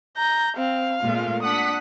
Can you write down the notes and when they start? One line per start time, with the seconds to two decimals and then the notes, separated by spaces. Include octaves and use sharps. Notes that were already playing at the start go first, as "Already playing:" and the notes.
0.18 A#5 G6
0.57 C4 F5
1.02 A#2 G#3 A3 F4
1.43 D4 F#5 D#6 B6